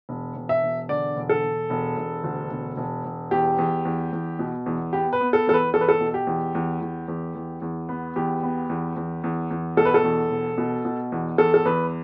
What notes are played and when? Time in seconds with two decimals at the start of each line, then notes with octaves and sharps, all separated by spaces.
0.09 E1
0.35 E1
0.49 E5
0.63 E1
0.89 D3 D5
1.17 E1
1.29 A4
1.43 E1
1.70 E1
1.97 E1
2.24 D2
2.51 E1
2.77 E1
3.05 E1
3.31 E2 G4
3.58 E2
3.85 E2
4.12 E2
4.39 B2
4.66 E2
4.93 B3 G4
5.13 B4
5.20 B3
5.33 A4
5.47 E2 A4
5.54 B4
5.73 E2 A4
5.81 B4
5.89 A4
6.00 B2
6.14 G4
6.27 E2
6.55 E2
6.81 E2
7.08 E2
7.35 E2
7.62 E2
7.89 B3
8.16 E2 G4
8.43 B3
8.69 E2
8.96 E2
9.24 E2
9.51 E2
9.77 B2 A4
9.85 B4
9.94 A4
10.04 E2
10.31 E1
10.58 B2
10.85 B2
11.12 E2
11.38 E2 A4
11.54 A4
11.65 E2 B4